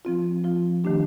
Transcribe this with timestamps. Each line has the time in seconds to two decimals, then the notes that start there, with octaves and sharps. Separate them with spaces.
0.05 F3 C4 F4
0.44 F3 C4 F4
0.84 D#3 A3 D4 G4